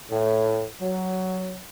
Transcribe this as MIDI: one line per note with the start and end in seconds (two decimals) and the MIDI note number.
0.11 0.64 45
0.81 1.59 54